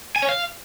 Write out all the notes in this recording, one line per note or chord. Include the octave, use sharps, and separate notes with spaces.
G#5
C#5
F5